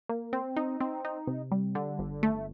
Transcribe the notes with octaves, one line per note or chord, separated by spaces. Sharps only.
A#3
C4
D#4
C4
D#4
C3
G3
D3
G1
A3